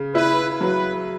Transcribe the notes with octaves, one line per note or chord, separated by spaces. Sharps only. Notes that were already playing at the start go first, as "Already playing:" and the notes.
Already playing: C#3
E4 B4
F#3 B4